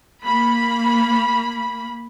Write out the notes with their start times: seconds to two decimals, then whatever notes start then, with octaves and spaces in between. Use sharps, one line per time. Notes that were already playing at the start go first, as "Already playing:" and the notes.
0.24 A#3 B5